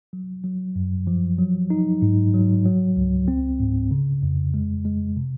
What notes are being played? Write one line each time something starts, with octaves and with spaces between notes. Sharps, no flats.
F#3
F#3
F#2
F3
F#3
D#4
G#2
F#3
F#3
C#2
C4
G#2
C#3
F2
G#3
G#3
C3